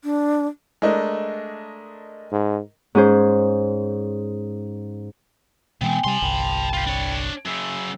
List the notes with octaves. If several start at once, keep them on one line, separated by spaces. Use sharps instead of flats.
D4
G#3 A3 D4 A#4 D#5
G#2
G#2 C#4 G#4 C5
B2 E3 G#3 B3 C4 G5 G#5
C3 G3 G#5 A5 C6
G1 C2 G5 B5
F4 G4
D4 C#5
F#2 C#3 E6